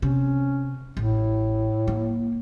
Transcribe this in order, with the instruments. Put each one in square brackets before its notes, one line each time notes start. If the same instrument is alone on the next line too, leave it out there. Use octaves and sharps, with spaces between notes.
[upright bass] C3 [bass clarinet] C#4
[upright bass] A1 [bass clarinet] A2
[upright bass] A#3